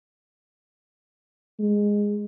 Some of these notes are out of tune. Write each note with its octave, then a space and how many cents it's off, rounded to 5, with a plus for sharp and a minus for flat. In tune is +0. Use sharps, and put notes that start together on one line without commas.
G#3 -10